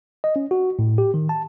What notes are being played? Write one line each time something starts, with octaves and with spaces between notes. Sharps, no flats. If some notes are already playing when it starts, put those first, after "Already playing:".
D#5
C#4
F#4
A2
G4
D#3
A5